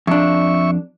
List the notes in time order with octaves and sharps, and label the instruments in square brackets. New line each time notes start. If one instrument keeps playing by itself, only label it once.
[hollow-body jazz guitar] F2 D4 [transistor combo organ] E5 C#6